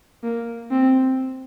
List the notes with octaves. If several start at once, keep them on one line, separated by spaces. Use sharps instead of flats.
A#3
C4